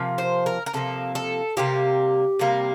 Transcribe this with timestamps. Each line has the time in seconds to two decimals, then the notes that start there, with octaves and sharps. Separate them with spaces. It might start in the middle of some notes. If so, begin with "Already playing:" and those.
Already playing: C3 F3 A#3
0.18 C5
0.46 A#4
0.66 A#4
0.73 C3 F3 A#3 A4
1.15 A4
1.57 C3 G3 A#3 G4
2.39 C3 G3 A#3